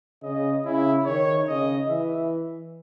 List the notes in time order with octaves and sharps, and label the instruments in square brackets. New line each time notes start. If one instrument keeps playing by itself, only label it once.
[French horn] C#3 [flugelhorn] D#5
[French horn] C#3 [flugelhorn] E4
[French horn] D#3 [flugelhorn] C#5
[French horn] C#3 [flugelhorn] D#5
[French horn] E3 [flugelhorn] E5